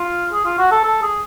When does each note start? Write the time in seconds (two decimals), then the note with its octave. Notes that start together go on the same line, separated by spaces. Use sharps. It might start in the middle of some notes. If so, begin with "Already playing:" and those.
Already playing: F4
0.33 G#4
0.45 F4
0.59 F#4
0.71 A4
0.85 A4
1.02 G#4